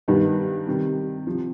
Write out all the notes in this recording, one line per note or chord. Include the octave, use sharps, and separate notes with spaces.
G2 D#3 G3 B3 D#4
C3 D#3 G3
C3 F3